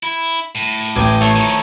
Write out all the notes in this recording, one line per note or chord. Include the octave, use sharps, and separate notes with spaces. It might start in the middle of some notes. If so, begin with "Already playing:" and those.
E4
A2
A1 G5 G#5 D6
E2 A3 A4 C#5
D#3 F3